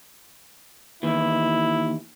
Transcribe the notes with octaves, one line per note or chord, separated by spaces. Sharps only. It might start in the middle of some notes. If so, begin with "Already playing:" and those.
D#2 E3 E4